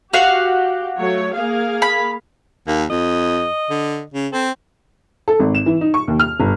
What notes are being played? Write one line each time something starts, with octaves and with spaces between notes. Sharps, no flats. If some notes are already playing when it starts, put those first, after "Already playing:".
F#4 G4 F5
F#3 A3 C#5
A#3 G#4 F5
B5
D#2 A#3
F2 D#5
D3
C#3
C4 A4
A4
G#1
E7
E3
D#4
C#6
D#2
F6
G1